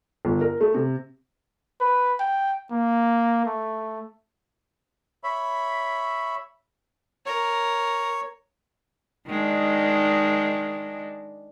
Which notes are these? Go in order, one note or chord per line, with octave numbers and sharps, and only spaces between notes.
G1
A#4
A3
C3
B4
G5
A#3
A3
C#5 E5 B5
A#4 C#5
D#3 G#3 D4